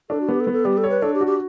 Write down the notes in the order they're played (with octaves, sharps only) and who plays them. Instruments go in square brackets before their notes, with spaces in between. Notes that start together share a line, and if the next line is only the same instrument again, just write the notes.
[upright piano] D4 [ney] A4
[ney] F#4
[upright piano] B3 [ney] G4
[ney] A4
[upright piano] B3
[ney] A4
[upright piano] G3 [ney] G4
[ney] A4
[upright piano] C#5
[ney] B4
[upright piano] D4 [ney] A4
[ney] G4
[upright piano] F#4
[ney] G4